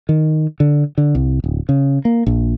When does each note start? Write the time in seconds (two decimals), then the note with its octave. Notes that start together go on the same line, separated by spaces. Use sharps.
0.09 D#3
0.60 D3
0.98 D3
1.15 C2
1.44 D1
1.69 C#3
2.05 A#3
2.27 A#1